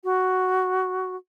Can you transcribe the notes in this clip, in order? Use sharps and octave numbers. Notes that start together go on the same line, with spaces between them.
F#4